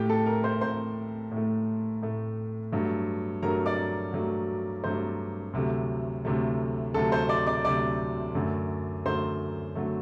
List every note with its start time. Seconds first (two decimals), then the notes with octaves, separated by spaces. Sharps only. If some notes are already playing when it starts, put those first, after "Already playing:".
Already playing: A2 A3 G4 G5
0.09 A4 A5
0.26 A#4 A#5
0.44 C5 C6
0.61 A2 A3 C5 C6
1.31 A2
1.37 A3
2.02 A2 A3
2.72 G2 F#3 A3
3.43 G2 F#3 A3 A#4 A#5
3.66 D5 D6
4.13 G2 F#3 A3
4.84 G2 F#3 A3 C5 C6
5.53 D2 C3 F#3 A3
6.25 D2 C3 F#3 A3
6.94 D2 C3 F#3 A3 A4 A5
7.12 C5 C6
7.29 D5 D6
7.47 D5 D6
7.64 D2 C3 F#3 A3 D5 D6
8.35 F#2 D3 F#3 A3
9.06 F#2 D3 F#3 A3 C5 C6
9.75 D3 F#3 A3